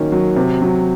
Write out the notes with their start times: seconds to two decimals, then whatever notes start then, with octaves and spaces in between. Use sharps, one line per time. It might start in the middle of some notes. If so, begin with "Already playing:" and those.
Already playing: D#3 F#3 A#3 C#4
0.12 F#3
0.36 C3
0.62 F#3